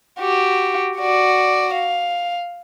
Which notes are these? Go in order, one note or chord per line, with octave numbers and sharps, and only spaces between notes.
F#4 G4
F#4 D5
F5